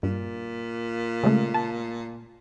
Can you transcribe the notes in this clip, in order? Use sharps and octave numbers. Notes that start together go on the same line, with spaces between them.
G2 A#2
C#3 G#3 A3
A5